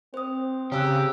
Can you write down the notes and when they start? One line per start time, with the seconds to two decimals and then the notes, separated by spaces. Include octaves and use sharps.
0.14 C4 C5 D#6
0.72 C#3 G4 A#5 E6 F#6